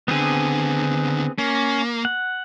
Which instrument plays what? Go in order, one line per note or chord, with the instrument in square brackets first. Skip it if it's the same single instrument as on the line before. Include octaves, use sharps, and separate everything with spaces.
[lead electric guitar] D#2 D3 [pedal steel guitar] B3 C4 G#4
[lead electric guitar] A#3 [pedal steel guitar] C#4
[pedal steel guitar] F#5